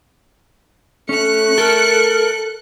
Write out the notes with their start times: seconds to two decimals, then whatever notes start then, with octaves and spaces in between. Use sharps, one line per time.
1.09 A3 C#4 F#6 C#7
1.58 A4 A#4